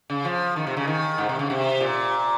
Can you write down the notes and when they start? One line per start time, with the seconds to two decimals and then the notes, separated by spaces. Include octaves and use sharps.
0.10 C#3
0.25 F3
0.56 D#3
0.67 C3
0.77 C#3
0.88 D#3
1.18 G#2
1.29 C3
1.39 C#3
1.50 C3
1.80 A#2